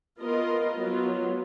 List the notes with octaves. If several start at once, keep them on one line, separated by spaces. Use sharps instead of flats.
B3 F4 A#4 D#5
F#3 B3 F4